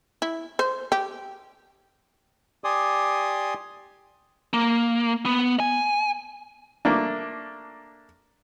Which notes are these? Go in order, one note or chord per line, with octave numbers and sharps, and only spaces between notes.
E4
C5
G4
G4 D5 G#5 C6 D#6
A#3
B3
G#5
A3 A#3 D4